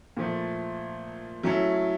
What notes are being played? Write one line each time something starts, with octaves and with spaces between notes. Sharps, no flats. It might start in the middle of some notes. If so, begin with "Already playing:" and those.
A#2 F3 A3
F#3 A3 C#4 E4